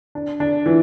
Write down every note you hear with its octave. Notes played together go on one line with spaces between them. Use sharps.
D4
D4
E3